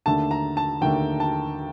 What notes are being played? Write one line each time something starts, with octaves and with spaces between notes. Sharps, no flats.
D#2 D3 A3 D4 A5
A#5
A5
D#2 D3 A3 D4 G5
A5